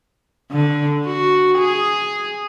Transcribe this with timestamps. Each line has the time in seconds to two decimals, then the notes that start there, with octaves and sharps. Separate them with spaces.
0.51 D3
1.06 F#4
1.58 G#4